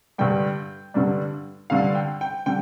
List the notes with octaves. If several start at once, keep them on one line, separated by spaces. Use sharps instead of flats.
G2 D3 G3 D4 G5
G2 D3 G3 D4
G2 D3 G3 D4 F5
G5
G5
D3 G3 G5